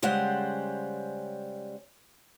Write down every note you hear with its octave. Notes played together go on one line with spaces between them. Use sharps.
C#3 G3 G#3 C5 F#5